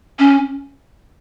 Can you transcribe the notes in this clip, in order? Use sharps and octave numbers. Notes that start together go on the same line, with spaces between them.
C#4